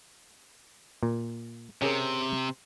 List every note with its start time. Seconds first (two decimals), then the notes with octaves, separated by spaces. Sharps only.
1.03 A#2
1.82 C3 C#4 G#4 A#4